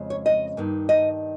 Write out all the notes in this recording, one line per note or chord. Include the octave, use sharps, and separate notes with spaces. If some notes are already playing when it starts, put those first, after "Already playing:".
Already playing: F2 C#3 G#3
C#5
D#5
G2 D#3 A#3
D#5